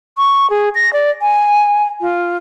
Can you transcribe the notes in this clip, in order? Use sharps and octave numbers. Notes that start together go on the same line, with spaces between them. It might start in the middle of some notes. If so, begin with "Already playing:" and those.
C#6
G#4
A#6
D5
G#5
F4